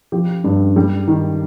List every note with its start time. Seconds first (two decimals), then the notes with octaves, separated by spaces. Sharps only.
0.12 F3 G4
0.44 G2
0.76 G3
1.08 D#3